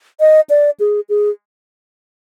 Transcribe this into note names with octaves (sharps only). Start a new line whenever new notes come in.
D#5
D5
G#4
G#4